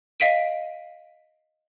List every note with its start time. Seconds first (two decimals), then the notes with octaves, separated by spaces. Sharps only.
0.20 D#5 F5 B6 D7 D#7